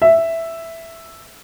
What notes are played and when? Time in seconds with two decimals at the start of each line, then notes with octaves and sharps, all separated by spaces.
0.02 E5